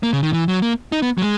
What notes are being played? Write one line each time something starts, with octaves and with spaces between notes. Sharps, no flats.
A#3
C#3
D#3
E3
F#3
A#3
D#4
B3
F#3
G#3